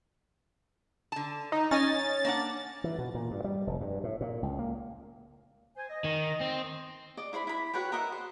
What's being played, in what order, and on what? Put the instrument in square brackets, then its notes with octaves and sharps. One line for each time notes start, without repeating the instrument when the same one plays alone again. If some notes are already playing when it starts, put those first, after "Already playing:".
[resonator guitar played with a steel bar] D3 A5
[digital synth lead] D#4
[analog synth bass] C#4 [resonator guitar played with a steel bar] C#5 D#5 G#5 [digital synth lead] A6
[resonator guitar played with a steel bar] A#3 D4 F#5
[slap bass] E3
B2
A#2
G2
G3
F1
G2
A2
A#2
C#2
A#3
[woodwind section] C5 G#5
D#5
[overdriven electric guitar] D#3
C4
[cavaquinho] D5 D#5 D6
E4 C5 D5 B5
E4 B5
F#4 B4 C#5 G5
A#4 D#5 E5 F#5
C5